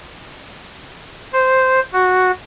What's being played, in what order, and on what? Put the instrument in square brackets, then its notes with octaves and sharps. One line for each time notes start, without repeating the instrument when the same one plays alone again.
[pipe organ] C5
F#4